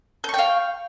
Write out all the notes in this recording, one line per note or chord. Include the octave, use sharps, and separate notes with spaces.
F5 G5 C#6 G6